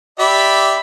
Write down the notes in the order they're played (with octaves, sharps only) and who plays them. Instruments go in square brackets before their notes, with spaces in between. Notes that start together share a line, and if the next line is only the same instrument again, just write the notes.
[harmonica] G4 D5 E5 [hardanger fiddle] B5